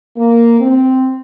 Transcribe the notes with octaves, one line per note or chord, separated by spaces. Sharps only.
A#3
C4